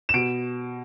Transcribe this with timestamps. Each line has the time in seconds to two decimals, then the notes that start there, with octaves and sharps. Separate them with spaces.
0.09 E7
0.14 B2 D7